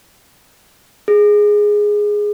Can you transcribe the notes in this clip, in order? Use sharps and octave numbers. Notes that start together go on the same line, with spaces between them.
G#4